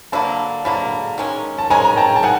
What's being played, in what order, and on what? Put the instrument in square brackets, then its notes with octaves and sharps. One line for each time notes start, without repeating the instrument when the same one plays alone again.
[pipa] D3 F#3 A#3 [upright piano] A5 B5
[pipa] D3 F#3 A#3 [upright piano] A5 B5
[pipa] D#3 G#3 C#4
[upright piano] A5
[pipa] D#3 G#3 C#4 [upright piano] G#5 A#5
[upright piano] A#5
G5 A5
A5
[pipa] D#3 [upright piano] F#5 G#5